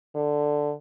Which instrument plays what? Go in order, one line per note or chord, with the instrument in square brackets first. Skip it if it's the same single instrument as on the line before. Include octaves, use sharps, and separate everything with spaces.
[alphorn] D3